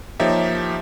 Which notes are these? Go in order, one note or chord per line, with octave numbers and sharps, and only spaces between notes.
F3 A#3 D#4 G4 C#5 E5